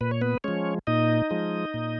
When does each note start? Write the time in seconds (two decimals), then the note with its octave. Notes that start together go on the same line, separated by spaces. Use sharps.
0.01 A#2 B4
0.11 C#5
0.21 B3 B4
0.44 F3 G#3 C#4 C#5
0.87 A#2 D#4 D#5
1.31 F3 G#3
1.74 A#2